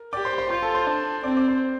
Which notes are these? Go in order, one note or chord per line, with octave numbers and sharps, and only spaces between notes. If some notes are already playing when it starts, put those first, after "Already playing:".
Already playing: A#4
G4 D5 D6
C5 C6
C5 C6
F4 C5 C6
A4 A5
C5 C6
D4
C4 D5 D6
D5 D6
C5 C6